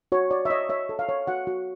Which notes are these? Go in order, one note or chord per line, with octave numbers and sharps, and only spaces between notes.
F#4 C#5
C#5 D5
E5
C#5 D#5
C#5 E5
A4
F5
C#5
F#4 F#5
F#4